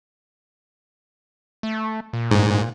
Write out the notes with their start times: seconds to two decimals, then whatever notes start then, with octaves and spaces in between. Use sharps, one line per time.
1.63 A3
2.13 A#2
2.31 G#2